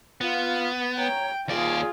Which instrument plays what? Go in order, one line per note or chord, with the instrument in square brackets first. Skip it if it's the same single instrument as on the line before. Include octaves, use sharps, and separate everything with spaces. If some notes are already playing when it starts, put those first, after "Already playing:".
[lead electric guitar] B3 [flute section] F4
[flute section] C#5 A#5 [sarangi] G5
[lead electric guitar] D#2 D5 [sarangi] F4 [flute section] G#4